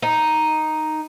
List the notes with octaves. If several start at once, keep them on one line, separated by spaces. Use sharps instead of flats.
D#4